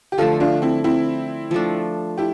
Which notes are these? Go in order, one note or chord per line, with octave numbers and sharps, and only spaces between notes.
G4
D3 F3 A3 F4 A4
D4 F4
C4 E4
C4 E4
F3 A3 D4
E4 G4